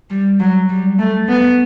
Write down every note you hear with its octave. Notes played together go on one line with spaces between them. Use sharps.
G3
F#3
G3
A3
B3